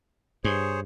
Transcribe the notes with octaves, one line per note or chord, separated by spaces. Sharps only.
G2 G#4 C5 C#5